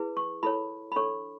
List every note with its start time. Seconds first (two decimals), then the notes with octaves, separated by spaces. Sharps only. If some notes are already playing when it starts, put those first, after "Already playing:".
Already playing: E4 G#4 B4
0.17 C#6
0.43 E4 A4 C#5 B5
0.92 B5
0.96 D4 A4 C#5 C#6